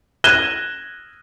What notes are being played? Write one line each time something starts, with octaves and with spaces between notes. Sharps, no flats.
F#6 G#6 A#6 D#7 E7 G7